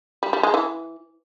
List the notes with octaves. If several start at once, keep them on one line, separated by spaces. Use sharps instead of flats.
G3
G3
G#3
E3